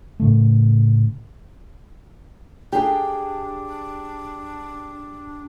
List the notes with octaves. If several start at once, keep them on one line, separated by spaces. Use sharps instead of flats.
A2 C#3 A3
D4 G4 G#4